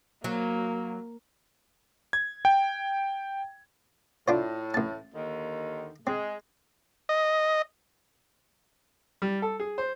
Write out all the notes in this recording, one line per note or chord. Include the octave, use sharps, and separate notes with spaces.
F#3 A#3
G#6
G5
A2 D4 F4 C5
A1 A5
D#2 D3 D#3
G#3 C4
D#5
G3
A4
G#4
C5